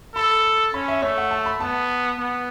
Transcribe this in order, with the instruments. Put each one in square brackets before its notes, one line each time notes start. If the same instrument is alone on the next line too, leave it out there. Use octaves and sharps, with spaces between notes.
[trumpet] A4 [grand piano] B5
[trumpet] C#4 [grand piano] B5
[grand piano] E5
[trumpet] A3 [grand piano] C#5
[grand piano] F#5
A5
B5
[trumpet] B3 [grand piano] A5
[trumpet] B3